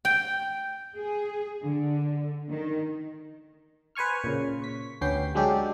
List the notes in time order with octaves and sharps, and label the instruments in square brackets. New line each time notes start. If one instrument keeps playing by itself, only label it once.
[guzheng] G5
[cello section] G#4
D3
D#3
[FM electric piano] B4 C5 G#5 C#6 F6
A#2 C#3
C#6 B6
D2 B3 C#4 G4 G5 C7
F#3 G#3 D4 G4 A4